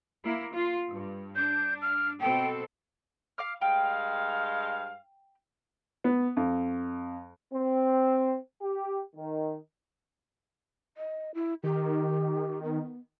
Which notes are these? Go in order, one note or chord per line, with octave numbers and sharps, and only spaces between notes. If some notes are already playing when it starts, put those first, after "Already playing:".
A#3 E4
F4
G2
D4 G6
F6
B2 C4 A4 G5
F5 D6 F6
G2 G#3 F5 G5
B3
F2
C4
G4
D#3
D#5
E4
D#3 G4
B3